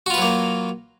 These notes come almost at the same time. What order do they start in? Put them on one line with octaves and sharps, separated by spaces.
F#4 F4 B4 F#3 A#3